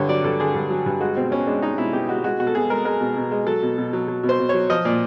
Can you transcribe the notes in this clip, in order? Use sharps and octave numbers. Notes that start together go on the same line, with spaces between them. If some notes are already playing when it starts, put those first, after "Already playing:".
Already playing: G2 D3 C#5
F#3 D5
G2 A4
D3 G#4
G2
F#3
G2
G#3 F#4
B2 C4
B2 C#4
G#3 D4
G#3 D#4
B2 E4
B2 G4
G#3 F#4
G#3 F#4
B2 F#4
A4
B2 G#4
G#3 A#4
G#3 A#4
B2
B2
G#3
F#3 A4
B2
B2
F#3
F#3
B2
C5
B2
C#5
F#3
F3 D#5
A#2 D5